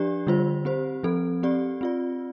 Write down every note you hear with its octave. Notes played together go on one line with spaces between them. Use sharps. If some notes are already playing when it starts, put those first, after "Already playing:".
Already playing: F3 D4 G4 D5
D3 G3 F4 C5
C4 G4 C5
F3 C4 A4
C4 G4 D5
C4 F4 D5